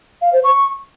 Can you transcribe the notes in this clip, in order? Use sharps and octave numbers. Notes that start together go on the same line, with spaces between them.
F5
C5
C#6